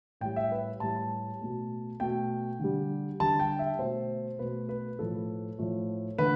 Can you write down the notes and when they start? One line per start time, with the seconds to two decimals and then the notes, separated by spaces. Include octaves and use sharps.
0.21 A2 G3 G5
0.36 E5
0.52 B4
0.80 A2 G3 A5
1.41 B2 A3
2.00 B2 A3 G5
2.60 D3 G3
3.20 D3 G3 A5
3.40 G5
3.59 E5
3.79 B2 A3 C5
4.39 B2 A3 B4
4.69 B4
4.99 A2 F3 A3 A4
5.59 A2 F3 A3
6.18 D3 A3 B4